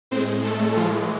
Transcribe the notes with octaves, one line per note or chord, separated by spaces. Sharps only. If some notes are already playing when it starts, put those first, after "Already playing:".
A2 G#3 C4 C5
A3 A4
A2 E3 F3 G#3 F4